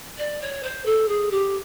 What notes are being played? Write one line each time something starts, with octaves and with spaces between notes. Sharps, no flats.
D5
C#5
C5
A4
G#4
G4